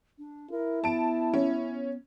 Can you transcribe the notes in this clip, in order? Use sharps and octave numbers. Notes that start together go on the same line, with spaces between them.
D4
E4 A#4
B3 A5 D7
C#4